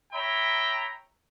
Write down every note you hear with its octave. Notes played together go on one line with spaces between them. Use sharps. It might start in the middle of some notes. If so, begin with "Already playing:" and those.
C#5 E5 G5 A#5 B5